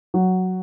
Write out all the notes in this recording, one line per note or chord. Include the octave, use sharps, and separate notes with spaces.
F#3